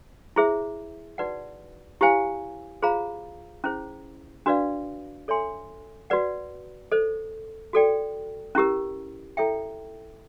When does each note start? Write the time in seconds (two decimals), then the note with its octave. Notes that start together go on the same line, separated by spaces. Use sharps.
0.36 E4 G#4 C5 E5
1.18 D#4 F#4 B4 D5 F#5
2.01 E4 G4 C5 F5 G#5
2.82 F4 G#4 C5 F5 A#5
3.64 C#4 E4 G#4 C5
4.46 D4 F#4 B4 D5 F5
5.28 A4 C#5 E5 G#5 C6
6.10 F#4 B4 D5 F#5
6.92 A4 C5 D#5
7.73 F#4 A4 D5 G5
8.55 C#4 E4 G4 A#4
9.37 E4 A4 C#5 E5 G5